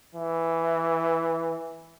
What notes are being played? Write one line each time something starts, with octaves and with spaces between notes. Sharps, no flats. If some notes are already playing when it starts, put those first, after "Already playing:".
E3